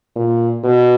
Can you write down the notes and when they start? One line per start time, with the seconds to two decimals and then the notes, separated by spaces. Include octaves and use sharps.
0.15 A#2
0.64 B2